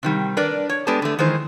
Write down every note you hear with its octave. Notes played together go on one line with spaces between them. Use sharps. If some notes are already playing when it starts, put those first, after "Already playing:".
C3 D#3 G3
D4 A#4 B4 D5
C#5
G#3 B3 D4 G4 A4 A5
D3 A3
D#3 E3 G#3 C5